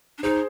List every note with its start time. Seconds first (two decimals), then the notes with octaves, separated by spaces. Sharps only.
0.18 D4
0.23 D#4 G#4 C5